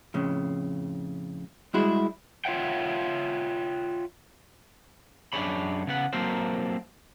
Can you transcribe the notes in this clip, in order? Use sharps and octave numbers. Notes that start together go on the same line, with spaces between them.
F2 A2 C#3
G3 G#3 E4 F#4 G#4
F4 C#5 E5 F#5 G5
F#2 C#3 D4 G#4 C#5 B5
C#3 B3 F#5
F#3 A#3 C4 A4 A#4 C5